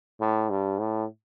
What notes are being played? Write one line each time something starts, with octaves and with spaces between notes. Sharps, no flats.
A2
G2
A2